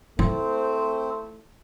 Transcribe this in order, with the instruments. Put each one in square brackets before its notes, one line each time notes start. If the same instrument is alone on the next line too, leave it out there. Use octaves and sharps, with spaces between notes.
[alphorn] A3 [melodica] C4 C5 [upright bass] E4